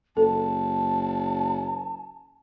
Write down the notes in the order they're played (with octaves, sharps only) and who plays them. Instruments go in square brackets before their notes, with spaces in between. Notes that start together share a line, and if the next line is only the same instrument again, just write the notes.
[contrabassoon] F#1 [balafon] A4 [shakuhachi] A5